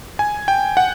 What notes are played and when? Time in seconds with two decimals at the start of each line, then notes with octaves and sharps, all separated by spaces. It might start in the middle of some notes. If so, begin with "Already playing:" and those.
0.19 G#5
0.48 G5
0.77 F#5